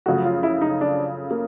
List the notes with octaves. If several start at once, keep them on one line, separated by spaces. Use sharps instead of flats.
F#2 C#3 F3 A3 F#4
F4
E4
D#4
D4
A#3